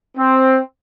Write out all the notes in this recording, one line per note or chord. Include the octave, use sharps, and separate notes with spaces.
C4